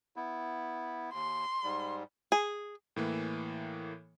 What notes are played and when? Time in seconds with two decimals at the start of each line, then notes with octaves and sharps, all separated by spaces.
0.16 B3 E4
1.14 D#2 C6
1.64 G#2 G3
2.32 G#4
2.96 A2 E3 A#3